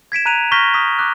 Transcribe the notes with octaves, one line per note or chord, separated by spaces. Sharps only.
G#6 B6 D7 E7
A#5 F#6 D#7 F7
C#6 F6 G6 A#6 B6 G7
D#6 B6
D6 D#6 F#6